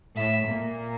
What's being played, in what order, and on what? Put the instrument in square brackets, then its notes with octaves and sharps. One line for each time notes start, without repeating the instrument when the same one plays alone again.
[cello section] A2 A3 [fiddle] E5
[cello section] A#2 A#3